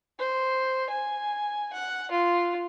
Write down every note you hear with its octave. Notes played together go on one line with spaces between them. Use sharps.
C5
G#5
F#5
F4